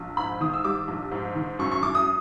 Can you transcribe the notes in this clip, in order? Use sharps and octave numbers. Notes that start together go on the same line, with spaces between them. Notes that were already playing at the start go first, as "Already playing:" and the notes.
Already playing: A#1
G#2 B5
D#3 D#6
E6
G3 D6
A#1
G#2
D#3
F#2 C#6
C#6
F#2 D6
D#6